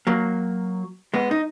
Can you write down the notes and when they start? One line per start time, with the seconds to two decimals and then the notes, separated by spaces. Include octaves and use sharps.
0.07 F#3 A#3
1.14 G#3 B3
1.31 D#4